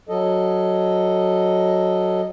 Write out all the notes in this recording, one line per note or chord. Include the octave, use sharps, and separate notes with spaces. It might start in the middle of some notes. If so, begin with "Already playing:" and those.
F#3 A4 D#5